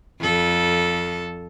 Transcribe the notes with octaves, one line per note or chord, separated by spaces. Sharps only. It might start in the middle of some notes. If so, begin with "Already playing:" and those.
F2 A4